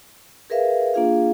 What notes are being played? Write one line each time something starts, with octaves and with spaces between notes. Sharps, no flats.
G#4 A#4 B4 E5 F5
A#3 D4 F4 G#4 F5